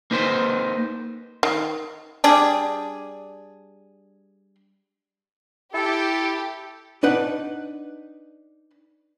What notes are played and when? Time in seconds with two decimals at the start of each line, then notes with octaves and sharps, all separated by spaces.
0.11 A#3 D#4 B4 C5
1.43 D#3
2.24 G3 D4 G#4
5.74 E4 G4 A4
7.03 D4 D#4 B4 F#5